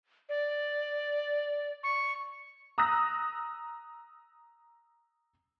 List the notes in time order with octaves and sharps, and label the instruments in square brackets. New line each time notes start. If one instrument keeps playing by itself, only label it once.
[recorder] D5
C#6
[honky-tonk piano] A#5 D#6 E6 F#6 A#6